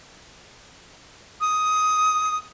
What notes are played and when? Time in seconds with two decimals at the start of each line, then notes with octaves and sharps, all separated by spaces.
1.41 D#6